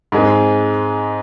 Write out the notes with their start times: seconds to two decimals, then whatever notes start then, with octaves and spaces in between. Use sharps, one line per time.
0.12 G#2 G#3 C4